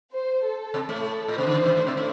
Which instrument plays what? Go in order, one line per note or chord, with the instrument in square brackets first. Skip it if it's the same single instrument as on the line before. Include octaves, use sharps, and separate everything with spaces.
[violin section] C5
A4
[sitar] C3 C4
A2 A3
[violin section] A4
[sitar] A2
[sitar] C3 [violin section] C5
[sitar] D3
E3
G2 G3
A2 A3
C3 C4
A2 A3